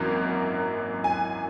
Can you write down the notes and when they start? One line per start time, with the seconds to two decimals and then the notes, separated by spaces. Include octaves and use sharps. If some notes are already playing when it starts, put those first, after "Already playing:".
Already playing: G#1 F#2 E3 A#3 A#4
1.04 G#5